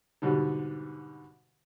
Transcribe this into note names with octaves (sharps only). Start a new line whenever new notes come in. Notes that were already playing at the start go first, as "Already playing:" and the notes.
G#2 B2 D3 G3